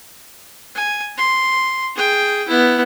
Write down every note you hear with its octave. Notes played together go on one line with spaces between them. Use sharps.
G#5
C6
G#4 G5
B3 E4